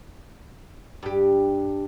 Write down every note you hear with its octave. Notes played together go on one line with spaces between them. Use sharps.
G2 G4